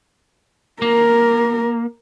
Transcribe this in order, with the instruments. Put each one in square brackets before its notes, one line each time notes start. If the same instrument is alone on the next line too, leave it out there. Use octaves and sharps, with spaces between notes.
[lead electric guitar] A#3 [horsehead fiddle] A#4